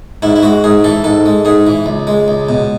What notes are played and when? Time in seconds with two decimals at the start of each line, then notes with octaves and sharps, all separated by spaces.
0.22 G#2 E4
0.36 E4
0.43 G#3 F#4
0.64 G#2 G#4
0.84 E3 A4
1.04 G#2 A4
1.26 G#3
1.45 G#2 G#4
1.66 E3
1.86 C#2
2.07 G#3
2.28 C#2
2.49 B2